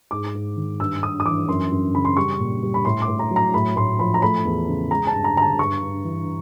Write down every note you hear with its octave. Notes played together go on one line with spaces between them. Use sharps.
G#2 D6
G#2
D#3
G2 E6
G2 D#6
D#6
E3 D6
F#2 C6
F#2
C#3 B5
C6
G3 C#6
A#2
G3
B5
A2 C6
D6
A2
A#5
F#3
A#5
A2 B5
A2 C6
F3 B5
A#5
A3 B5
E2
C#3
G#3 A#5
A5
G2
A#5
D3 A#5
A5
G2 C#6
G2
E3